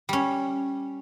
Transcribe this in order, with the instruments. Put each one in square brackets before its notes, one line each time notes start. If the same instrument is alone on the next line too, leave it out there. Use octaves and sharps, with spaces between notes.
[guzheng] G3 C#4